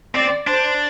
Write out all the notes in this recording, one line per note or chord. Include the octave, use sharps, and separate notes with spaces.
C4 D5
D4 C5